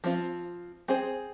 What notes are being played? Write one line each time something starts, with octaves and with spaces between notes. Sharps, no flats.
F3 C4 F4
C4 G#4 C5